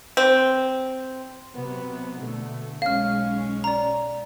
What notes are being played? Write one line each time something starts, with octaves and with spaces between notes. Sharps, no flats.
C4
C3 F#3 B3
B2 D3 A3
B1 G#3 C#4 F5 F6
D5 A#5